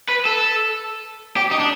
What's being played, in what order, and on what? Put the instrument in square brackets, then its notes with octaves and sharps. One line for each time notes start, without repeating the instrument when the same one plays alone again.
[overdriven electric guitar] B4
A4
G4
D#4
D4